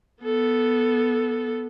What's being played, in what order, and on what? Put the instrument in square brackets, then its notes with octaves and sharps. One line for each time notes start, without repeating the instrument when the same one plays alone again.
[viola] B3 A4